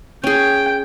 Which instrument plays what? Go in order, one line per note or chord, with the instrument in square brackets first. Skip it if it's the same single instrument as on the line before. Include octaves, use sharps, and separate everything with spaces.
[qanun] C#4 G#4 [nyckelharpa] G5